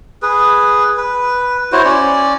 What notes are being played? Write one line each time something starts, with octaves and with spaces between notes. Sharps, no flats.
G#4 B4
B4
E4 F#4 C5 C#5
C#4 D5